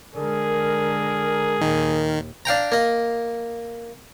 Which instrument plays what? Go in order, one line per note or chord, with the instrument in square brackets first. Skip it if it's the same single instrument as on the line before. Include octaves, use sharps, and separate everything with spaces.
[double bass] D3 G#3 [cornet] G#4 [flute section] A#4
[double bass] D#2 A#2 [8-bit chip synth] D#3
[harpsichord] D4 F5 G5 A#5
A#3 D#5